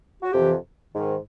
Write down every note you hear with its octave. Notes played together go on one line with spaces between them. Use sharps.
F#4
F2 C3 E3 G4
G#2 D#3